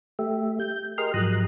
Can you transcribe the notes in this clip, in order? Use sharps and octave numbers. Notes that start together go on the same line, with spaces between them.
A3 G4 E5
G6
G4 G#4 A#4 D#5 C6 F6
G#2 F3 F#3 A#5 D#6 F#6